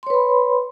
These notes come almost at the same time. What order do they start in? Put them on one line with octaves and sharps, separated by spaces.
C6 C#5 B4 B5